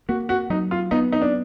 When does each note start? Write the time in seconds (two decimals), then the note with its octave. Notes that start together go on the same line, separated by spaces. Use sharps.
0.09 A#3 F#4
0.29 F#4
0.50 F#3 D#4
0.71 F4
0.91 B3 D#4
1.12 D#4
1.22 D4